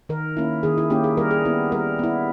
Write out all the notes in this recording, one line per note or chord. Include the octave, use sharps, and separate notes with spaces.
D#3 A#4
A#3 C#4 E4
D#3 G#4
E4
A#3 C#4 E4 G4
G#4
G3 A#4
G#4
B3 E4
G3 A#4
B3 E4